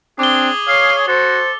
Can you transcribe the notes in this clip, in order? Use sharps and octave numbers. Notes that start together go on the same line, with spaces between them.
C4 D4 G#4 D6 G7
C#5 F5
F#4 A4 C5